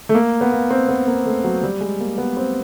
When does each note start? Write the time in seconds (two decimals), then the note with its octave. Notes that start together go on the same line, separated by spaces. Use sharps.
0.09 A3
0.14 A#3
0.41 B3
0.52 A#3
0.71 C4
0.89 B3
1.07 A#3
1.26 A3
1.44 F#3
1.63 G3
1.81 G#3
2.00 A#3
2.18 B3
2.37 C4